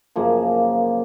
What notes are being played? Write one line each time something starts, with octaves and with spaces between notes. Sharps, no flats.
F#2 C#3 F3 A#3